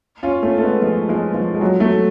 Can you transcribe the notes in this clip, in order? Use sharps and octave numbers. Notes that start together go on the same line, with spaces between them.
C#4 F4
A3 C#4
A3
G#3 B3
F3 G#3
F3 G#3
F3
G#3
F#3
F#3 A3